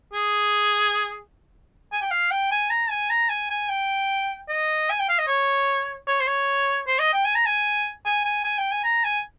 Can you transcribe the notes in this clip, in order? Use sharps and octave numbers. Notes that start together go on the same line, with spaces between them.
G#4
G#5
G5
F5
G5
G#5
A#5
G#5
A#5
G#5
G#5
G5
D#5
G#5
G5
F5
D#5
C#5
C#5
C5
C#5
C5
D#5
G5
G#5
A#5
G#5
G#5
G#5
G#5
G5
G#5
A#5
G#5